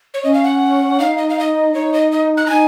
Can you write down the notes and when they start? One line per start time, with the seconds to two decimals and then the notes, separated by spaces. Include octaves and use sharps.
0.14 C#5
0.24 C#4 D#5
0.34 F5
0.44 F#5
1.00 D#4 F5
1.18 D#5
1.30 F5
1.40 D#5
1.74 D#4 C#5
1.94 D#5
2.12 D#5
2.37 F#6
2.46 A#5
2.50 D#4 G#5